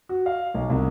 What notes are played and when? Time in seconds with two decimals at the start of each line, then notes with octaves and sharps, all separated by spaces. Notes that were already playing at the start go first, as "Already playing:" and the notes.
0.09 F#4
0.26 F5
0.54 B1
0.70 C2